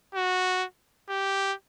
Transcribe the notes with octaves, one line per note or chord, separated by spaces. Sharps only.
F#4
G4